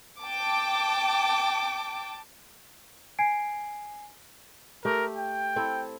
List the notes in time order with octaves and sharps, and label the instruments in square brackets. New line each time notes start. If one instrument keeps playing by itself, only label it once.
[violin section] G5 A5 D6
[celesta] G#5 G#6 C7 D7
[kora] A3 G4 [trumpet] A#4
[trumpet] G5
[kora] C4 E4 A4